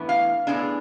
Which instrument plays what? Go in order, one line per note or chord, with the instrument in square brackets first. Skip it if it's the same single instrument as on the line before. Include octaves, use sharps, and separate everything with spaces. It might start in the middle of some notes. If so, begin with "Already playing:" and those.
Already playing: [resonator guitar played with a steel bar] A2 E3 B3 D4
F5
A2 E3 B3 D4 G#4